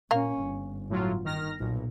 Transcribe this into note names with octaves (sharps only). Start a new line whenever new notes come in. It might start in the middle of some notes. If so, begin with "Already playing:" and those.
A#2 A#3 C#4 F5
G1
A2 F#3 F4
D#3 F6 A#6
B1 A#2